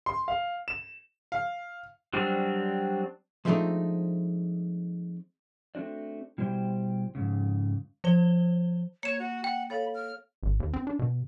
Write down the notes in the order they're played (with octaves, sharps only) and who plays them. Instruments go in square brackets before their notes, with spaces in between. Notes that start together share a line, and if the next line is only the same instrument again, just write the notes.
[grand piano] C6
F5
E7
[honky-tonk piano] F5
[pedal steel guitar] F#3 G3 C4 D4
[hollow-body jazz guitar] F3 G#3 A3 C4 D4 D#4
[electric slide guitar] A3 C4 D4 F#4 D5
B2 G3 E4 C5 D5 G5
F2 G#2 C#3
[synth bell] F3 C5 G7
[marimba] A#3 [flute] C#5 [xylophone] C#7 E7
[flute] F#4
[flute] F#5 [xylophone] G5
[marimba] A4 C#5 F5 [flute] B5
[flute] F6
[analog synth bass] G#1
D#2
C4
D4
B2